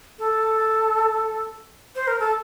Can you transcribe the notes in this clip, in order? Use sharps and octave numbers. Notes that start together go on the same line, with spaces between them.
A4
C5
A#4
A4